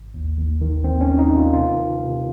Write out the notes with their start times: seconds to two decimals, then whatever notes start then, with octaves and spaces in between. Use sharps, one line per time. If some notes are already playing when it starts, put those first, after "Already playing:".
Already playing: G#1
0.14 D#2
0.38 D#2
0.61 D#3
0.84 D#2 C4
1.01 C#4
1.07 D#3
1.19 D#4
1.31 D#3
1.37 F4
1.54 C3 F4
1.76 D#3
2.00 C3